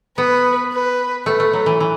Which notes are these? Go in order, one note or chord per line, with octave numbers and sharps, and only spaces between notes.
B3 B4
B4
A3 B4
A3
F#3
E3
E3